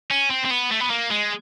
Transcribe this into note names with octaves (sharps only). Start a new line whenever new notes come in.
C#4
C4
C4
B3
A3
B3
A#3
G#3